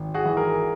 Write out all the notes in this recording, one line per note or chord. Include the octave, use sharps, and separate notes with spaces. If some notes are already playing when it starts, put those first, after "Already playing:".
Already playing: G#1
F#4 G#4
E3
G#4 A#4